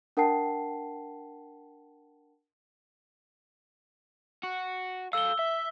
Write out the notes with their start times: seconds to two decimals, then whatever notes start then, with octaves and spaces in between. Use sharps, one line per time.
0.17 D4 A#4 F#5 G5 A5 C7
4.43 F#4
5.13 A4 F5 E6 G7
5.39 E5